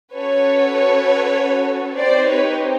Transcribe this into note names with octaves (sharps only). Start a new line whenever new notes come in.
C#4 F#4 A4 B4 C#5
C4 D#4 G4 C5 D5
B4 C#5